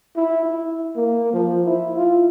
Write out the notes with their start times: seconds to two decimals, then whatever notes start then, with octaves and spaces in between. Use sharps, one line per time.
0.16 E4
0.46 E4
0.96 A#3
1.33 F3
1.67 E4
1.96 F4